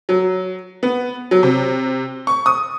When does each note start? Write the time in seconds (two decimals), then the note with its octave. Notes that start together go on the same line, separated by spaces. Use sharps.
0.09 F#3
0.83 B3
1.31 F#3
1.43 C3
2.27 C#6
2.46 D#6